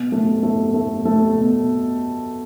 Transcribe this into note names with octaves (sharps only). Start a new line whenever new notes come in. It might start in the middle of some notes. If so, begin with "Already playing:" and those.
Already playing: B2
A3
A3
A3
A3
B2